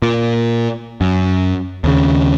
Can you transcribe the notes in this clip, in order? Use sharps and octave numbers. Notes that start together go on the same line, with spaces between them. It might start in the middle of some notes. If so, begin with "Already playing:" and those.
A#2
F#2
D#2 C#3